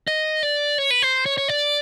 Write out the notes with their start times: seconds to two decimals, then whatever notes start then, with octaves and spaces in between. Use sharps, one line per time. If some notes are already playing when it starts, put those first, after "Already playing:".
0.08 D#5
0.43 D5
0.78 C#5
0.90 B4
1.02 C5
1.26 C#5
1.38 C#5
1.49 D5